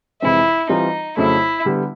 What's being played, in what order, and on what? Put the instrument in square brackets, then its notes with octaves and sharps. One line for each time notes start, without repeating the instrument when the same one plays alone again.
[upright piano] F2 C3 E3 G#3 C4 [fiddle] E4
[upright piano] E3 G3 C4 F4 [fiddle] D#4
[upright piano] F2 C#3 F#3 A3 [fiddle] E4
[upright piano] D3 G3 B3